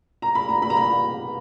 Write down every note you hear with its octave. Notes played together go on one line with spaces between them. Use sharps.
A#5
B5
A#5
B5
A#5
B5